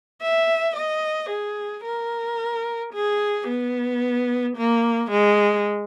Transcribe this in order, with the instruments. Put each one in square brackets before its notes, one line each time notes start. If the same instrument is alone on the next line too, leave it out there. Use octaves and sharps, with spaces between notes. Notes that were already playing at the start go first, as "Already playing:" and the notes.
[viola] E5
D#5
G#4
A#4
G#4
B3
A#3
G#3